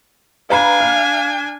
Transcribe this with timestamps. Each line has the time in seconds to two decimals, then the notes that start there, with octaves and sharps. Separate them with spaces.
0.50 D4 B4 F5 G#5 A#5 B5
0.80 F6